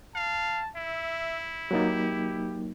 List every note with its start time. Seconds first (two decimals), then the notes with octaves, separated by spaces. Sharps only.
0.15 F5 A5
0.76 E4 E5
1.71 F#3 A#3 D#4 G4